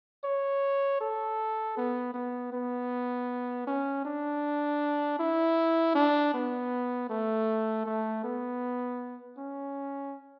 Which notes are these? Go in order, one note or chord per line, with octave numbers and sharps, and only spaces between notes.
C#5
A4
B3
B3
B3
C#4
D4
E4
D4
B3
A3
A3
B3
C#4